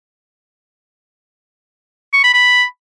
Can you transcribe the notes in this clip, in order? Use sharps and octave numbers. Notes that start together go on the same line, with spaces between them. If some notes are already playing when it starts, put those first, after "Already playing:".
C#6
B5
B5